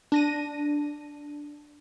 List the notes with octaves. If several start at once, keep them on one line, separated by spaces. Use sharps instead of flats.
D4 A#6 D#7